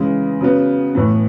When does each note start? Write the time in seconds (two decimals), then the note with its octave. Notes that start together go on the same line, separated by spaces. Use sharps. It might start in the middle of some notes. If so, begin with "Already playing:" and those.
Already playing: C#3 E3 G#3
0.41 C#3 F#3 B3
0.95 A2 E3 B3